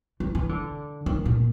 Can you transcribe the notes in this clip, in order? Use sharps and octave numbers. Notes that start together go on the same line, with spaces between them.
E3
E3
D3
D#3
A#2